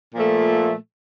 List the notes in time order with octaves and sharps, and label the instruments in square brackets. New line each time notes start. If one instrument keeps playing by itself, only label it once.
[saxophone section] A#2 F3 A3